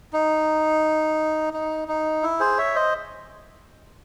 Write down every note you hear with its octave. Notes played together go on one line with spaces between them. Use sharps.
D#4
D#4
D#4
E4
G#4 C5
C#5 E5
C5 D#5